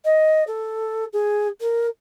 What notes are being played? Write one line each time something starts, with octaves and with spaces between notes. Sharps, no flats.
D#5
A4
G#4
A#4